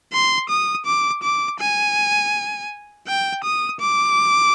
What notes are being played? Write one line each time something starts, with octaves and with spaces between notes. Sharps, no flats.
C6
D#6
D6
D6
G#5
G5
D#6
D6